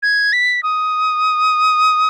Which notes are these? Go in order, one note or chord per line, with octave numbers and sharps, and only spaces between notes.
G#6
B6
D#6